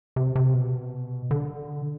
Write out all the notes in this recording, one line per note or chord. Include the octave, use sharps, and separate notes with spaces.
C3
C3
B2
D3